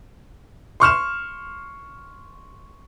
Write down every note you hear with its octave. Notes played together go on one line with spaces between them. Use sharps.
C6 C#6 F6 E7